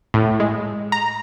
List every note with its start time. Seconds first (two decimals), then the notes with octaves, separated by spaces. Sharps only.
0.14 A2
0.40 G#3
0.92 A#5